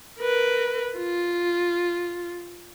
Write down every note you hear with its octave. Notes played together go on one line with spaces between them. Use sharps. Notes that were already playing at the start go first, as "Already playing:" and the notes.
A#4 B4
F4